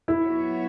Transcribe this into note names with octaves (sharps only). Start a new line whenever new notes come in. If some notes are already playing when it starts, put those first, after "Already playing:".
E4
F#3 B3 F#4 C#5 E5